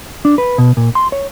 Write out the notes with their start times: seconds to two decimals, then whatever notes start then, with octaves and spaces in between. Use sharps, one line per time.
0.25 D4
0.38 B4
0.58 B2
0.77 A#2
0.95 C6
1.12 C#5